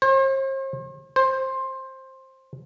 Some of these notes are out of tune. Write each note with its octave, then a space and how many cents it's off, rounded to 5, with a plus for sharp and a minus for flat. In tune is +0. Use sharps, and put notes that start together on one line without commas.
C5 +45
C5 +15